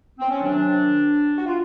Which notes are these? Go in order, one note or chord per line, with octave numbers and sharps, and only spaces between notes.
C4
C#4
C3 D#3 F#3 D4
F#4
F4